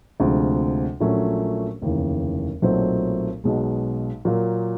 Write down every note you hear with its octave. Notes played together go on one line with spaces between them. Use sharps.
D2 C3 F3 G#3
A#1 A#2 F#3 A3 C#4
F1 D#2 C#3 E3
B1 A#2 F#3 A3 C4
B1 B2 G#3
A#2 F#3 A#3